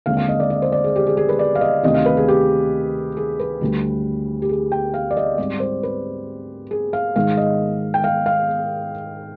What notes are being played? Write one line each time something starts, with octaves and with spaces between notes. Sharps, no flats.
D#2 D3 G#3 C4 F5
F5
D#5
D5
D#5
C5
D5
G#4
G4
G#4
G#4
B4
D5
F5
D#5
D2 C3 D#3 D#5
F5
B4
G#4
G4
G#4
B4
D2 D3 G3
G4
G#4
G5
F5
D5
D#5
G#2 G3 C4 D5
C5
B4
G#4
F5
G#2 D#3 G#3 F5
D#5
G5
F5
F5